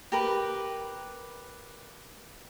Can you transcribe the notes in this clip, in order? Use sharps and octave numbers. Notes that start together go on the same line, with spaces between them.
G4 A#4 B4